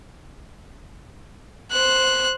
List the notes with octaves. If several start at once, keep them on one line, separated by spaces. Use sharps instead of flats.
C5 F#6